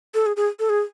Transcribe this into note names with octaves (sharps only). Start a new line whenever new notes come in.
A4
G#4
G#4
A4
G#4